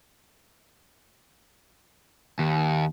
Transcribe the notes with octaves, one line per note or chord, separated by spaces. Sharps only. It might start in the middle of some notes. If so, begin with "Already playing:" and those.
D#2